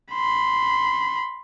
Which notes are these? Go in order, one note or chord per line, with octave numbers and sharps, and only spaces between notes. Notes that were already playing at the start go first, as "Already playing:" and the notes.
B5 C6